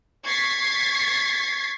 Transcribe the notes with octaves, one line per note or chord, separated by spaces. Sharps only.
C#6 G#6 A6 B6 C7